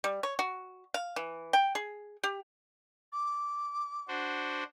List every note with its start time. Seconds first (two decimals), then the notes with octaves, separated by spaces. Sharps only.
0.04 G3
0.23 C#5
0.39 F#4
0.94 F5
1.16 E3
1.53 G5
1.75 G#4
2.23 G4
3.12 D6
4.08 D4 F#4 C5